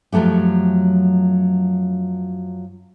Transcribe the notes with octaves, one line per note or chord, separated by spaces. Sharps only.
F#2 F3 F#3 A3 G4